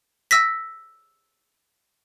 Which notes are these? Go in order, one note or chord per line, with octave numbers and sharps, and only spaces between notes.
E6 A#6 B6